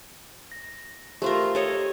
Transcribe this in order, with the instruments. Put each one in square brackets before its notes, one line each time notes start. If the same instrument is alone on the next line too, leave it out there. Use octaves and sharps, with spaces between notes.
[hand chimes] A#6
[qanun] A3 F4 A#4 [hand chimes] G4 C5
[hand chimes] G4 [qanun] A4 C#5 D#5